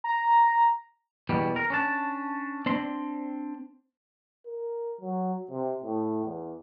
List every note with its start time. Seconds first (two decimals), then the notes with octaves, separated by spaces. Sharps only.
0.04 A#5
1.29 E2 B2 G3
1.56 A#4
1.70 C#4 D4 A5
2.66 C4 D4 C6
4.46 A#4
5.01 F#3
5.52 C3
5.84 A2
6.25 E2